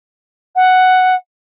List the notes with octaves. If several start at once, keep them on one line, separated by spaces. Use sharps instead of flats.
F#5